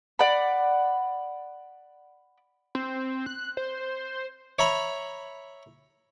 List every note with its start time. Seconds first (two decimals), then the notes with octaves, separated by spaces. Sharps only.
0.19 D5 F#5 B5
2.75 C4
3.26 F#6
3.57 C5
4.59 C#5 E5 A#5 B5